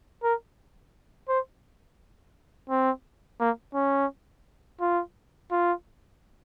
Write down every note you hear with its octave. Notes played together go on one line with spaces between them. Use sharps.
A#4
C5
C4
A#3
C#4
F4
F4